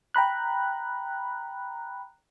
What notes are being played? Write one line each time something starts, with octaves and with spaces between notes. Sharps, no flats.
G5 A#5 B5 F#6